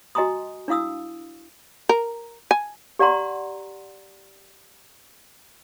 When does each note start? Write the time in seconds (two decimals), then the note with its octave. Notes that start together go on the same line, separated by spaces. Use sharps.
0.15 F#4 D#5 G#5 A#5 C6 D#6
0.68 D4 E4 F5 D#6 E6
1.89 A#4
2.51 G#5
2.99 G4 D5 F#5 A#5 C6